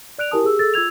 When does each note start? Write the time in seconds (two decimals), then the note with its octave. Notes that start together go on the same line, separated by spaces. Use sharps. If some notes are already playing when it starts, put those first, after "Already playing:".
0.18 D5 F#6 D7 F7
0.31 E4 G4 A#4 G#5 A5 D#6
0.43 G4 G#4 E6
0.59 G#4 A4 E6 A6
0.74 F4 E6 G#6 F7